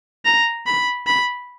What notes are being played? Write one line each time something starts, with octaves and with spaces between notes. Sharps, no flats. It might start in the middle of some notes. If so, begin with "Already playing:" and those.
A#5
B5
B5